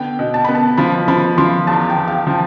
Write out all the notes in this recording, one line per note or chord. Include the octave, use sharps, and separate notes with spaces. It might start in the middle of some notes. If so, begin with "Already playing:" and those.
Already playing: D3 B3 G5
B2
A5
B3 B5
A5
F3 B5
F3 B5
F3 C6
E2 A5
G5
E2
F5
G5
F3 A5